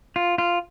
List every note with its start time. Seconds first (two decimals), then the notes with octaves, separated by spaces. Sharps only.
0.16 F4
0.38 F4